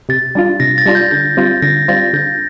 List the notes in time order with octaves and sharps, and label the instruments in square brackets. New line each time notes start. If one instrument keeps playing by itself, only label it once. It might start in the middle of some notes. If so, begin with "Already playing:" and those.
[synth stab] C3 [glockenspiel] A6
[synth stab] G3 D4 F4
[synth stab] C3 [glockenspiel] A#6
[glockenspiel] A6
[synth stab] G3 D4 F4
[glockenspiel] G6
[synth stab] D3 [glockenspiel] G6
[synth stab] G3 C4 F4 [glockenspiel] A6
[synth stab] D3 [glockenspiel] A#6
[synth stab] G3 C4 F4 [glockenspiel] A6
[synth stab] D3 [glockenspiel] G6